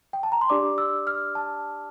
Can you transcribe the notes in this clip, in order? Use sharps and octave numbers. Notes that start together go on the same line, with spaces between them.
G5
A5
A#5
C6
D4 G4 D5 D6
E6
F6
A5